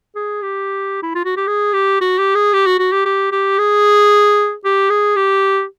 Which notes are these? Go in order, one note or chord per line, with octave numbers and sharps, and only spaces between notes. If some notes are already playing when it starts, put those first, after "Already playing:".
G#4
G4
E4
F4
F#4
G4
G#4
G4
F#4
G4
G#4
G4
F#4
F#4
G4
G4
G4
G#4
G4
G#4
G4